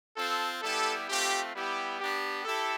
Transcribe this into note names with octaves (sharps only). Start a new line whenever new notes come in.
C4 F4 A4
G3 B3 E4 G4 A4
A3 C4 F4 G4
G3 B3 E4 G4
B3 D4 G4
E4 G4 A4